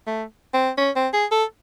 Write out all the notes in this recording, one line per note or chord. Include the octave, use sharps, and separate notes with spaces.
A3
C4
C#4
C4
G#4
A4